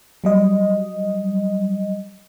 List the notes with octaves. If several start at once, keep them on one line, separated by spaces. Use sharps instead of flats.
F#3 G3 D#5